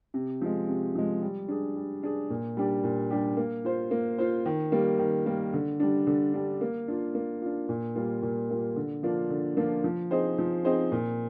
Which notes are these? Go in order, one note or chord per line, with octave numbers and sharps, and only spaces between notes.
C3
F3 G#3
C3
F3 G#3
G3
D4 G#4
G3
D4 G#4
A#2
G3 D4 G4
A#2
G3 D4 G4
A#3
F4 C5
A#3
F4 C5
D#3
G3 A#3
D#3
G3 A#3
D3
G3 D4
D3
G3 D4
A#3
D4 F4
A#3
D4 F4
A#2
G3 A#3 F4
A#2
G3 A#3 F4
D3
F3 A#3 D4 F4
D3
F3 A#3 D4 F4
F3
C4 D#4 G#4 C5
F3
C4 D#4 G#4 C5
A#2